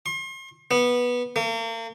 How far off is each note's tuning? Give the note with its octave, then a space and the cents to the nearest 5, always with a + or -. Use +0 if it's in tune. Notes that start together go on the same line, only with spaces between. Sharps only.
C6 +40
B3 -10
A#3 -40